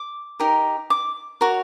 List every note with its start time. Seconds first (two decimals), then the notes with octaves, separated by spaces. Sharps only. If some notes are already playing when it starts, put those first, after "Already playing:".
Already playing: D6
0.40 D#4 G4 A#4
0.90 D6
1.41 F#4 A#4 C#5